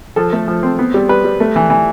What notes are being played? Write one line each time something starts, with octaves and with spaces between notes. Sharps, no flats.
F3 A4
A3
F3
C4
B3
G3
G3 B4
G3
A3
E3
E3